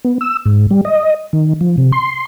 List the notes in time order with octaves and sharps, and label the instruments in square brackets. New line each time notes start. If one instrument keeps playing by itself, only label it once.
[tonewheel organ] B3
E6
G#2
G3
D#5
D#3
F3
C3
C6